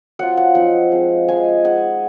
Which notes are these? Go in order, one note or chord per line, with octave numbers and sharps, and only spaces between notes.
F#3 C4 F4 F#5
F#5
F3 C4 D#4 F#5
F3 G#3 C4
F3 G#3 D#4 G#5
G#3 D#4 F#5